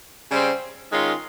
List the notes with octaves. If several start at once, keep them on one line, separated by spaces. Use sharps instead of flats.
C#3 G3 C4
D#3 G#3 C#4 F4